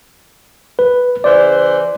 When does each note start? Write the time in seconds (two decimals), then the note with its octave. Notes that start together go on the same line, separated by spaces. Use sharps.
0.79 B4
1.24 C#3 E3 C5 D5